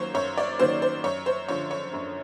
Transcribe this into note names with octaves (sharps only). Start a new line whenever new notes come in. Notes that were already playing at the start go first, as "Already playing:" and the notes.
Already playing: F#2 D#3 F#3 A#3 C5 C#5
F#2 C#5
D5
D#3 F#3 A#3 C5
C5
F#2 C#5
C5
D3 F3 C#5
C#5
F#2